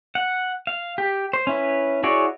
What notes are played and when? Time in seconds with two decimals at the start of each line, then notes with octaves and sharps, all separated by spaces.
0.15 F#5
0.67 F5
0.98 G4
1.33 C5
1.47 C#4 E4 B4
2.03 E4 F#4 G#4 C#5 D5